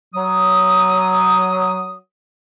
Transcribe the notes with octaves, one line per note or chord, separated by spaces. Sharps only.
F#3 D#6